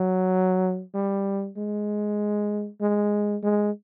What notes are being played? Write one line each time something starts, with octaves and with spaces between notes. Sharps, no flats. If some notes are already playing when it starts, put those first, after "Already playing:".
Already playing: F#3
G3
G#3
G#3
G#3